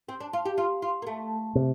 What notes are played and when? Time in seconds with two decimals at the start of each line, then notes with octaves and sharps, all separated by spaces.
0.09 C4
0.20 D4
0.33 F4
0.45 G4
0.58 F4
0.82 F4
1.02 A#3
1.07 A3
1.55 C3